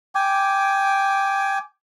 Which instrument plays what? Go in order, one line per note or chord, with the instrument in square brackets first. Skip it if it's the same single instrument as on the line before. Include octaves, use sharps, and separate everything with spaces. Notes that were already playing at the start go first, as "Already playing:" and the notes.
[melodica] G5 G#5 D6